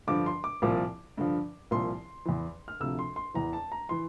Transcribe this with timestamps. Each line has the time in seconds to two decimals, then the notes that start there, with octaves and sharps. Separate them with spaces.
0.07 G2 D3 F3 D6
0.26 C6
0.44 D6
0.62 C2 A#2 F3 D6
1.17 G2 D3 F3
1.71 C2 A#2 F3 C6
2.25 E2 E3
2.68 F6
2.80 D2 C3 F3 E6
2.99 C6
3.16 C6
3.34 E2 E3 A#5
3.53 A5
3.72 A#5
3.89 E3 C6